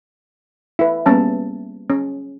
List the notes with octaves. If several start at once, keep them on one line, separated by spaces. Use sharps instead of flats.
E4 B4
G3 A#3 B3 C#4 A5
C#4